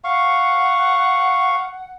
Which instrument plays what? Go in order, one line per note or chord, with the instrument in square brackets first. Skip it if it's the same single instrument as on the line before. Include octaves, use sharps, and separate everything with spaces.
[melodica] F5 C#6 [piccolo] F#5